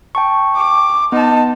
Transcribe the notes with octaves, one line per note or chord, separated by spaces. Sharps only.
G5 A5 C#6
D6
B3 D#4 A5